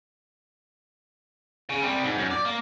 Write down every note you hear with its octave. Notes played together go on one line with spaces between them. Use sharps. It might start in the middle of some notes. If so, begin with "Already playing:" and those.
C#3
C3 G3
G#2
F#2
D5
A#3